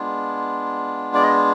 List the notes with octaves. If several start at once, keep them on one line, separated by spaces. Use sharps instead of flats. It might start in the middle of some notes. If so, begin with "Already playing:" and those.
Already playing: G#3 B3 D4 F4
D5
D#5